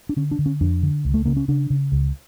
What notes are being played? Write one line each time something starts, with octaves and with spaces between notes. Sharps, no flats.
D4
D3 C#4
D4
D3
C#4
F2 D4
D3
C#2
A3
C#3 A#3
C#4
C#3 D4
C#3
C#2